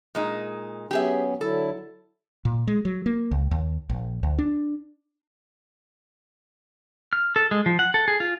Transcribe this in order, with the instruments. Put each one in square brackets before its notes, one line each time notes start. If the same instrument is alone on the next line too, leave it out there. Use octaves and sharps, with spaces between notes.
[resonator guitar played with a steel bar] A#2 G#3 D#4
[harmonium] F#3 B3 C#4 [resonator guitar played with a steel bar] G4 G#4 E5
[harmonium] D3 F#3 E4 [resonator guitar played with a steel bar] A4
[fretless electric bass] A#2
G#3
F#3
A#3
C#2
D#2
A#1
D2
D4
[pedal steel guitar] F6
A4
G#3
F3
F#5
A4
G#4
F4